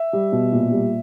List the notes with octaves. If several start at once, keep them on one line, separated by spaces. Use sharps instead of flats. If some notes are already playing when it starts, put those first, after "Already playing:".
Already playing: E5
G3
B2
A#2
G3